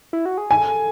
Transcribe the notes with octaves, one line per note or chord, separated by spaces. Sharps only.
E4
F#4
G#4
A4 G#5